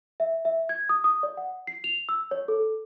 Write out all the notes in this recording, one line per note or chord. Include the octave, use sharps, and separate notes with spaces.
E5
E5
G#6
D#6
D#6
D5
F#5
C7
F7
E6
C#5
A4